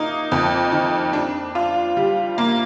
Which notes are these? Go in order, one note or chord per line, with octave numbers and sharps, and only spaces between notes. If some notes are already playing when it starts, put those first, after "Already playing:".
Already playing: A#3 D#4
F2
D#3
D4
F4
G3
A#3